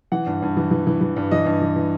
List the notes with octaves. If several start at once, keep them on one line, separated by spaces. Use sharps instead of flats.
E3 F#5
G2
G2
E3
E3
E3
E3
G2
E3 D#5
G2
E3
E3